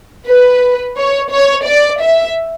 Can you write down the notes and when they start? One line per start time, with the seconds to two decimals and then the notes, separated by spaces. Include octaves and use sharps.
0.28 B4
0.97 C#5
1.31 C#5
1.66 D5
2.01 E5